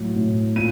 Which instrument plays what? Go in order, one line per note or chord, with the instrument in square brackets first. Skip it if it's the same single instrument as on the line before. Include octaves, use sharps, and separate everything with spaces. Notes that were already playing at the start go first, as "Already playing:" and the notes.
Already playing: [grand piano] A2 F#3
A2
A#2 D#7